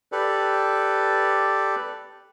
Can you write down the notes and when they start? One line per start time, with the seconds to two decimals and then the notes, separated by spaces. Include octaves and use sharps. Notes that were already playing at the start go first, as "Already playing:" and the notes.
0.12 G4 A4 B4 D5